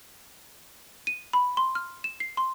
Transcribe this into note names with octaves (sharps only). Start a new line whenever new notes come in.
D#7
B5
C6
F6
E7
C7
C6